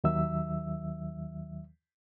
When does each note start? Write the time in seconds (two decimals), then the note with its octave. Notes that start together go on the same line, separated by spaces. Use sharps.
0.04 D#2 D#3 F#3 E5 E6